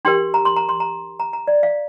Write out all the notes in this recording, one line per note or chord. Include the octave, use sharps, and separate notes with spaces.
D4 G4 A#4 C6
A#5
C6
A#5
C6
A#5
A#5
A#5
D5
F5